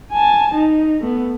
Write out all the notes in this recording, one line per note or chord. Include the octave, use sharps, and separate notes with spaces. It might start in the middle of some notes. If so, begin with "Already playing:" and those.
G#5 A5
D#4
A3 B3